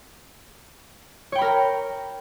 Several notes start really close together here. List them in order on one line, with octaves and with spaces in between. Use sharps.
C#5 G5 B5 A#4 A#5